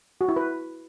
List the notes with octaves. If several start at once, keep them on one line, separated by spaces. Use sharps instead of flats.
F#4
E4
B4